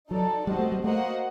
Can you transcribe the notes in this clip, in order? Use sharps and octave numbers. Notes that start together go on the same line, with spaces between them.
F#3 D#4 A4 D5
G3 C4 F#4 C5 D#5 A5
A3
G3
A3 A#3 F#4 C5 D#5 F#5